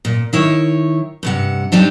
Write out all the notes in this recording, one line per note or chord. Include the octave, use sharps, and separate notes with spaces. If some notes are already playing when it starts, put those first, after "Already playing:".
A#2
D#3 E4 C#5
G2 C3 F#5
G3 C4 D4 D#4